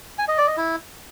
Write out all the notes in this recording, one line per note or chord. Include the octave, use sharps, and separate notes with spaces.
G#5
D#5
D5
D#5
E4